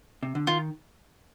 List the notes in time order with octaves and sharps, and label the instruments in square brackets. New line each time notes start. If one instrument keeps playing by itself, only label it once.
[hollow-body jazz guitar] C3
D3
[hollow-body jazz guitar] D#3 [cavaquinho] F4